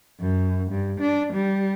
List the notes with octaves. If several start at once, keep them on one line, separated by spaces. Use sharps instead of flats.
F#2
G2
D4
G3